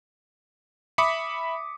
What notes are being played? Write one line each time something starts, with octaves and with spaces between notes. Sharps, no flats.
E5 B5 D6 D#6 B6 C#7